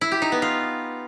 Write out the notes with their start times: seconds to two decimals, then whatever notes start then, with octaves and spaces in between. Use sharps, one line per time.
0.01 E4
0.12 G4
0.22 D#4
0.32 B3
0.42 F4